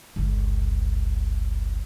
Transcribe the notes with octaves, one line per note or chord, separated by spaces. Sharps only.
G1 C#2